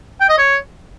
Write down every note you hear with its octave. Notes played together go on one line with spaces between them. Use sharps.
G5
D#5
C#5